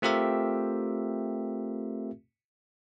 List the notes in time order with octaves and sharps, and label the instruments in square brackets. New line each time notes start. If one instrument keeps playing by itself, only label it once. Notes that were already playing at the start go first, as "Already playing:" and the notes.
[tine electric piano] A3 C4 F4 G4 A#4 E5